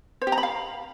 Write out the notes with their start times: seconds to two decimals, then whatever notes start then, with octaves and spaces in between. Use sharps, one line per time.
0.22 C5
0.27 G4
0.32 A#5
0.38 B5
0.43 F5